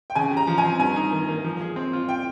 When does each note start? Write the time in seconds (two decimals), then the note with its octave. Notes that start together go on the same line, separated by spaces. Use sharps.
0.10 G5
0.15 C#3 G#5
0.31 G4
0.37 A#5
0.47 F3
0.58 G#5
0.64 C4
0.79 G2 G#5
0.96 D#4
1.12 D#3
1.29 A#3
1.44 F3
1.61 G#4
1.76 C4
1.93 F4
2.09 G5